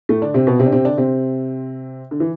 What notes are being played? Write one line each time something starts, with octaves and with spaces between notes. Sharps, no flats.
A2 A3
D3 D4
C3 C4
B2 B3
C3 C4
D4
C3 C4
D3 D4
C3 C4
D3
E3